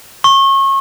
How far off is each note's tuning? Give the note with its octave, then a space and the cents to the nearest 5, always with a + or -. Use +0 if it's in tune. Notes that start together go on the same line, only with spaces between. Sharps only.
C#6 -30